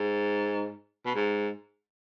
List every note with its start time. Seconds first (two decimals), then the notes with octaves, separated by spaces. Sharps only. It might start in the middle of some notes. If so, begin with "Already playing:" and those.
Already playing: G#2
1.06 B2
1.15 G#2